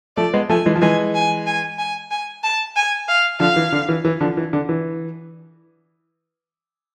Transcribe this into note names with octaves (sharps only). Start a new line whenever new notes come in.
F3 A3 D5
G#3 B3
F3 A3 G#5
E3 G#3
F3
E3 G#3 G#5
G#5
G#5
G#5
G#5
A5
G#5
F5
D3 F3 F5
E3
D3
E3
E3
D3 F3
E3
D3
E3